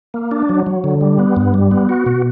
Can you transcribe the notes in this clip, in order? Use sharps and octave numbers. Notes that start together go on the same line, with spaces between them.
A#3
D4
F#3
F#3
D3
G3
B3
G2
G3
B3
F#4
B2